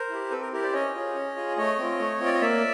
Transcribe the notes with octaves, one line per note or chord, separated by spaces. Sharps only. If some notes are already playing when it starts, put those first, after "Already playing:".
Already playing: A#4 C5
E4 G4
C4 A4 B4
A#4
E4 G4 A#4
C5 D5
C#4 C#5 D#5
F4 G#4
C#4
F4 G#4
A3 C#5 D#5
C4 F4
A3
C4 F4
D5
D#5
A#3 D5 E5